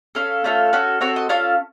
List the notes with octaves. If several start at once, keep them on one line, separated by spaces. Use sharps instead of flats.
C#4 A4 F5
A3 C#4 F4 A4
C#4 F#4 A4
C4 F#4 A4 C#5
D#5
C#4 F4 A4 F5